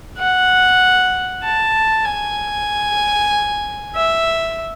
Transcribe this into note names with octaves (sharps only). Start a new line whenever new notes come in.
F#5
A5
G#5
E5